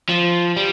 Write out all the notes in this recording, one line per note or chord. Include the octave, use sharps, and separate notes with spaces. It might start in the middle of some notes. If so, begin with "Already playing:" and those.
F3
G3